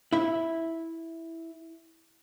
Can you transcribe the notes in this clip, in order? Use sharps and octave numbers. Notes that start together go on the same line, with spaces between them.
E4 E5